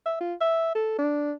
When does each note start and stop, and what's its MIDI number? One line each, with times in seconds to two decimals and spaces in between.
0.06 0.16 76
0.21 0.34 65
0.41 0.73 76
0.75 0.94 69
0.98 1.32 62